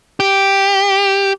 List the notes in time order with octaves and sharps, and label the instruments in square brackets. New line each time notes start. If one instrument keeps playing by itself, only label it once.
[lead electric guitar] G4